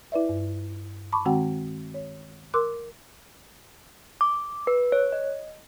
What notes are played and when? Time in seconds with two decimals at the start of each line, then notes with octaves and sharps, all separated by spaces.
0.12 E4 B4 D5 E5
0.29 G2
1.12 A5 B5 C#6 D6
1.25 D#3 G#3 C4 F#4 F#5 G5
1.94 C#5
2.54 A#4 C6 D6 E6 F#6
4.21 D6
4.67 B4
4.92 C#5
5.12 D#5